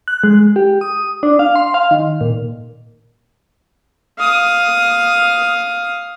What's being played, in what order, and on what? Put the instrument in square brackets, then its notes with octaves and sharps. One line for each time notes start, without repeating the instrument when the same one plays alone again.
[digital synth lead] F#6
G#3
G4
D#6
D4
F5
C6
F5
D#3
A#2
[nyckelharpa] F5 D#6